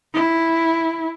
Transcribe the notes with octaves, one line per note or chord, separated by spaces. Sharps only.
E4